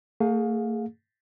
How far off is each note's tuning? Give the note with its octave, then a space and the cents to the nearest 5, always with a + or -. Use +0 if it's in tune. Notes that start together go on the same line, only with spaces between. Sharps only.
A3 +45 G#4 +0 F5 +30